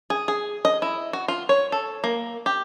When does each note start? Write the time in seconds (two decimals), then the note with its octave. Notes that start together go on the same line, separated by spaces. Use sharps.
0.10 G#4
0.28 G#4
0.65 D#5
0.82 E4
1.13 F#4
1.28 F4
1.49 C#5
1.72 A4
2.04 A#3
2.46 G4